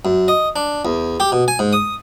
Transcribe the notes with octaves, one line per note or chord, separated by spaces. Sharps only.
F#2
D#5
D4
E2
G4
B2
G#5
G#2
D#6